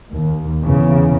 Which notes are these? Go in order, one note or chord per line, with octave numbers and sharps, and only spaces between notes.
D#2
E2 C#3